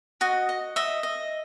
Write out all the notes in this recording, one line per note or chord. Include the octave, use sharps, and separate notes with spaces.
F#4 D#5
D#5
D#5 E5
D#5